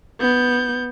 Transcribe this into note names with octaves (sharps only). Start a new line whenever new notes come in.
B3 G6